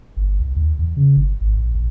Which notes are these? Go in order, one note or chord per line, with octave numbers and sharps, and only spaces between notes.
G1
C2
D#2
E2
C#3
G1
G#1
A#1
A#1